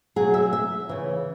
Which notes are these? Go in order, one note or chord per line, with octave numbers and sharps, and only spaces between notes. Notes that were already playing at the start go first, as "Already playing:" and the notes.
B2 F#3 G#4
E5
E5
C#3 E3